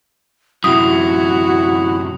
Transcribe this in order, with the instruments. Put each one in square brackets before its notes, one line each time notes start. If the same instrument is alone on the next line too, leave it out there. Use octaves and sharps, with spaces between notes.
[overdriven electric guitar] F#2 C3 [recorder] E4 [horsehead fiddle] F#4 [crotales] D#6